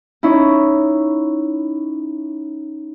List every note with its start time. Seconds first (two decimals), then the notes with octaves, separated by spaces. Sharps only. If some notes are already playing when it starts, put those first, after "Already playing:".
0.23 C#4 D#4 E4